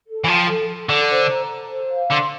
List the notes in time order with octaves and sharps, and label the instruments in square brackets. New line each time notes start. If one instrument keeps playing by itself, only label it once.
[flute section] A4
[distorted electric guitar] E3
[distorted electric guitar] F3 [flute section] G5
[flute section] A4
A4
[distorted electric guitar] D3 [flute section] A4
[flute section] C5
A#5
A4
C5
F5
[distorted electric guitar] D3 [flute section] C6